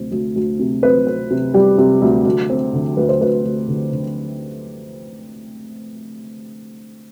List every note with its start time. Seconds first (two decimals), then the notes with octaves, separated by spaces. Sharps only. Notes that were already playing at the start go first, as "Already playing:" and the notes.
Already playing: D2 C3 C4
0.12 D2
0.36 D2
0.59 C3
0.83 C4 B4
1.07 C4
1.30 C3
1.54 G3 G4
1.78 C3
2.02 D2
2.26 D2
2.50 C4
2.73 D3
2.97 D2 B4
3.09 C5
3.21 D2 B4
3.45 D2
3.68 D3
3.92 D3